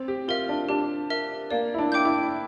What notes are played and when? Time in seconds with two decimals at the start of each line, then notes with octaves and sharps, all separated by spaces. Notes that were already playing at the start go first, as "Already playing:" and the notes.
Already playing: C4
0.08 G4
0.28 F4 A#4 E5
0.49 D4
0.69 D4 G4
1.10 A#4 E5
1.50 A#3 D5
1.74 E4
1.78 D4
1.92 G5 D6 G6
2.05 E4